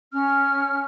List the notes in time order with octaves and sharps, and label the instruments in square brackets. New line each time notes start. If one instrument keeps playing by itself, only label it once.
[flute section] C#4 F6